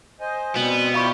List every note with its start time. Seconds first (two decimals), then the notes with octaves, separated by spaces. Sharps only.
0.20 C5 D#5 G#5
0.56 B2 G3 B3 C4
0.94 E4 F4 G4 D5 F5 B5 C#6